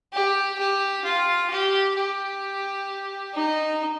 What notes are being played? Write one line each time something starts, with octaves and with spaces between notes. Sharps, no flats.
G4
G4
F4
G4
G4
D#4